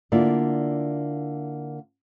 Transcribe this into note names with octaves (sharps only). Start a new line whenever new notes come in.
D3 A#3 E4 F4 D5